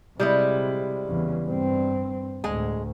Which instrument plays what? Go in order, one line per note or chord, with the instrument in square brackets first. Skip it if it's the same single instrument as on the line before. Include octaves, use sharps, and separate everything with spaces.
[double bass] C3 [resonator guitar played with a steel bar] G3 G#3 E4
[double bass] E2 C#3
G2 C4
[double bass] D2 A2 [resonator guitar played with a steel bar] G#3 G#5